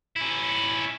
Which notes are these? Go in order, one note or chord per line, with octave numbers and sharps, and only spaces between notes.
C#4 E4